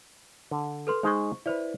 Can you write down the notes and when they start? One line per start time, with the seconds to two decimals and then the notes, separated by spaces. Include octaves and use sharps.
0.51 D3
0.87 A4 B4 C6
1.03 G#3 D#4 G#4 C5 C#6
1.46 E4 B4 C5 D5